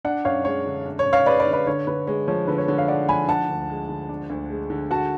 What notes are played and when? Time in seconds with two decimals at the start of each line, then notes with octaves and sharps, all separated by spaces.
0.05 D4 D5 F#5
0.25 F#2 C#5 F5
0.45 G#3 C#5
0.66 D3
0.86 D4
0.99 C#5
1.06 F#2
1.13 C#5 F5
1.26 G#3 B4 D5
1.39 B4 D5
1.46 D3
1.53 B4 D5
1.67 D3 C#5
1.87 D3 B4
2.07 G#3 C#5
2.28 F3 C#5
2.47 D3 B4
2.58 C#5
2.68 D3 C#5
2.78 C#5 F5
2.88 G#3 D5 F#5
3.09 F3 G#5 B5
3.28 D4 F#5 A5
3.49 D2
3.70 G#3
3.89 D3
4.09 D4
4.30 D2
4.50 G#3
4.70 D3
4.91 F#4 F#5 A5